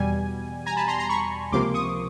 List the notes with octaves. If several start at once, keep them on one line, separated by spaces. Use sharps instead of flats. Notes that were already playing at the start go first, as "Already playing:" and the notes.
Already playing: E2 B2 G3 G#5
G#5 A#5
A5 B5
A#5 C6
A#5 C6
B5 C#6
C#2 C3 F3 A#3 C6 D6
C#6 D#6